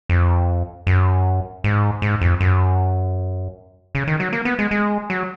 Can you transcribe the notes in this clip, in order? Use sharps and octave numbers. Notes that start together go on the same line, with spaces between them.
F2
F#2
G#2
G#2
F2
F#2
C#3
D#3
F#3
A#3
B3
G#3
G#3
F#3